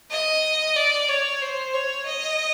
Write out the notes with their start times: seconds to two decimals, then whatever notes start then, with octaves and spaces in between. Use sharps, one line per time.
0.11 D#5
0.76 D5
1.08 C#5
1.42 C5
1.74 C#5
2.06 D#5